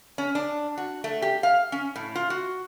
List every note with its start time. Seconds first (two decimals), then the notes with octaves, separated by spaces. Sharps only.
0.18 C#4
0.35 D4
0.78 F#4
1.04 A3
1.22 G4
1.43 F5
1.72 C#4
1.96 A2
2.15 F4
2.30 F#4